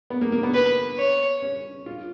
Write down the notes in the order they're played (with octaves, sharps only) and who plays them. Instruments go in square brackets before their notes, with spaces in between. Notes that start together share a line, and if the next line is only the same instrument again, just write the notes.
[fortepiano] B3
A#3
A#3
B3
[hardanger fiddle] B4
C#5
[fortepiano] C#4
F4